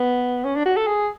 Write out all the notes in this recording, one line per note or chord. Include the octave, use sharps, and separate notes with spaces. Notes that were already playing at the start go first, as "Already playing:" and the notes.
Already playing: B3
C#4
D4
F#4
A4
G#4